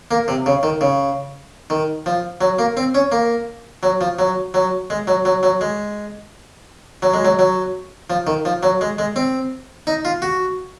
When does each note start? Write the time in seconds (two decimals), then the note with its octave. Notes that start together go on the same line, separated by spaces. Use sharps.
0.11 A#3
0.28 C3
0.46 C#3
0.63 D#3
0.81 C#3
1.70 D#3
2.06 F3
2.41 F#3
2.59 A#3
2.77 C4
2.95 C#4
3.12 A#3
3.83 F#3
4.01 F3
4.19 F#3
4.54 F#3
4.90 G#3
5.07 F#3
5.25 F#3
5.43 F#3
5.61 G#3
7.02 F#3
7.14 G#3
7.25 F#3
7.39 F#3
8.10 F3
8.27 D#3
8.45 F3
8.63 F#3
8.81 G#3
8.99 G#3
9.16 C4
9.87 D#4
10.05 F4
10.22 F#4